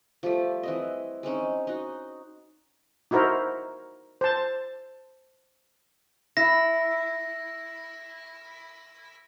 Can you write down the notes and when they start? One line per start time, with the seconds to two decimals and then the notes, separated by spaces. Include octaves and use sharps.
0.23 F3 G3 A3
0.63 E3 C4 D#5
1.23 G#3 C4 C#4 D#4
1.67 D#4 F#4
3.11 D#4 E4 F#4 A#4 C5
4.21 C5 A5
6.37 E4 A#6